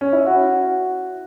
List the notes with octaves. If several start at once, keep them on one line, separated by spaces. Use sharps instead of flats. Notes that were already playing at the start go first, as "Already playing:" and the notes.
C#4
E4
F#4